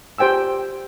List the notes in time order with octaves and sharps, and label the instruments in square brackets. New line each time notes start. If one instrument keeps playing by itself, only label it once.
[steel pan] G4 C5 G5 G#5 E6